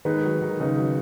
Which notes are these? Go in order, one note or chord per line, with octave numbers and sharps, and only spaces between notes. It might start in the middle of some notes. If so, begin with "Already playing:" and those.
D#3 G#3 D#4 B4
F#3
D#3
C#3 G#3 D#4 B4
F#3